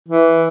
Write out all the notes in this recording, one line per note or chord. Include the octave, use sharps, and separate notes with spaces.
E3